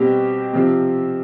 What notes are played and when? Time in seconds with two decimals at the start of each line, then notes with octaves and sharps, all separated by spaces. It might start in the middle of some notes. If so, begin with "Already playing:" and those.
Already playing: B2 G3 C4 G4
0.53 C3 F3 C4